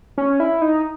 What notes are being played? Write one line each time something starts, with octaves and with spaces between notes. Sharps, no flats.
C#4
E4
D#4